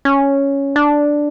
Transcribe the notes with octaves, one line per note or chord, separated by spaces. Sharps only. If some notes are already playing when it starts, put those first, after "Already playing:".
C#4
D4